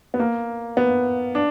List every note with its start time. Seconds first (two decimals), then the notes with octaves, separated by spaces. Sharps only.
0.14 B3
0.19 A#3
0.77 B3
1.35 D4